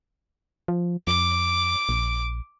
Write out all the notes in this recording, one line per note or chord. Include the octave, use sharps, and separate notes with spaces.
F3
F2 D6
A#1